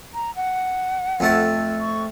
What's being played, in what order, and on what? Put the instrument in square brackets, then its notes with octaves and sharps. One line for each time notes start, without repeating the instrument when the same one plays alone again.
[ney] A#5
F#5
[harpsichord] F2 A3 A5
[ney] C#6